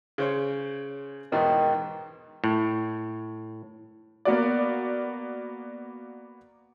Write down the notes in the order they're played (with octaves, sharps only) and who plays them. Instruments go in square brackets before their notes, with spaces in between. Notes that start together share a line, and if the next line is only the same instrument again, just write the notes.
[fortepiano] C#3 C5 C#5
[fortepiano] E2 G#2 B2 [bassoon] D#3
[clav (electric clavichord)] A2
[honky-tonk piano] A#3 B3 F#4 D5